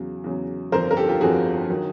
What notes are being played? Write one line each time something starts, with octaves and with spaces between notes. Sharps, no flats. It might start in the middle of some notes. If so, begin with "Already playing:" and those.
Already playing: E2 C#3 F#3
E2 C#3 F#3
G1 F2 D3 F3 A#4 C5
A#4
G4 A4
F4 G4
G1 F2 D3 F3 F#4 G#4
D#3 F#3